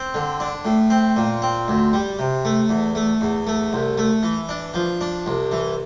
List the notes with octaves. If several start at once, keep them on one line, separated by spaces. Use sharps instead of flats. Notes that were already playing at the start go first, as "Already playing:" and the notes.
Already playing: C4
D3
D4
A2
C4
A#2
C4
D2
G3
C3
A3
E2
A3
E2
A3
C2
A3
E3
D4
F3
D4
C2
E3